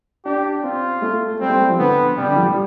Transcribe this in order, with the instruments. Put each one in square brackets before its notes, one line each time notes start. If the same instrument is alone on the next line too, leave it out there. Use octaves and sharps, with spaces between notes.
[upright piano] D4 [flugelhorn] G4
[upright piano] C4 [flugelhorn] F4
[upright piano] A3
[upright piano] G3 [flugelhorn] C4
[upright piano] A3
G3
F3
[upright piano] D3 [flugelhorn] B3
[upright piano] C3 [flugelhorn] G3
[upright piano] D3
F3
G3